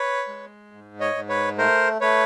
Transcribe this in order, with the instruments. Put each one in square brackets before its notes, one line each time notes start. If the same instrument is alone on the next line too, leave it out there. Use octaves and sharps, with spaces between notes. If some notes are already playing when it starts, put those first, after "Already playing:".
Already playing: [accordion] B4 C#5
G#3
G#2
C#5 D#5
G#2
B4 C#5
A3 A#4 C5
A3 B4 C#5